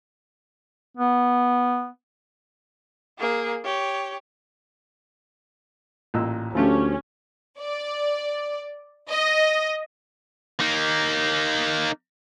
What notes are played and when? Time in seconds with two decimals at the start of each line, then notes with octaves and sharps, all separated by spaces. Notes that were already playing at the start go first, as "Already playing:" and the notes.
0.97 B3
3.19 A#3 G#4
3.64 G4 C#5
6.14 A1 A#2 E6
6.55 D2 F3 A3 C#4 G4
7.61 D5
9.10 D#5
10.60 A#3 D#4